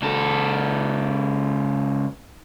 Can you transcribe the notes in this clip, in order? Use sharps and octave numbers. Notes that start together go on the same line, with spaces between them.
C#2 A4